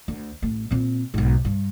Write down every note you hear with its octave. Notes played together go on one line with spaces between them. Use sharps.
D2
A1 A3
A#2 C4
B1 G#2
G2